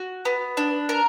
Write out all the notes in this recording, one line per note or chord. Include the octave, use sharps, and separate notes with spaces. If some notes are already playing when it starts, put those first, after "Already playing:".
Already playing: F#4
B3
D4
A#4